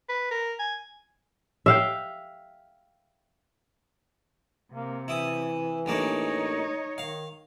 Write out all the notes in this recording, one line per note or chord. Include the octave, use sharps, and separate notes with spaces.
B4
A#4
G#5
E5 F5 G5
C3 A#3
E3 E4 D#6
A1 A#3 D4 D#4 C#5
D#3 F5